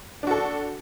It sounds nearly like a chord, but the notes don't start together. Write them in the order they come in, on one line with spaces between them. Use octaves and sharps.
D4 F#4 A4